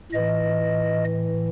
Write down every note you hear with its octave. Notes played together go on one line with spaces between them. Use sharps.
A2 E3 D#5